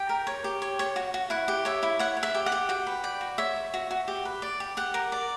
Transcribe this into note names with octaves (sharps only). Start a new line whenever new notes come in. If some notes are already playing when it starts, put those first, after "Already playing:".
Already playing: G4 G5
A#4
C#5
G4
C#5
C#5
F#4
F#4
E4 F#5
G4
C#5 E5
E4
C#5 F#5
C#5
E5
G4
F#5
G4
F#4 G5
B4
D5 G5
F#4
C#5 E5
C#5
F#4
F#4
G4
B4
D5
G4
G4 F#5
A#4
D5